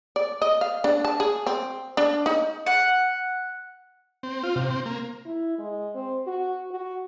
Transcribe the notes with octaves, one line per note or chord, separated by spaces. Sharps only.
D5
D#5
F5
D4
A5
G#4
C4
D4
D#4
F#5
C4
F4
C3
C4
A#3
E4
G#3
C4
F#4
F#4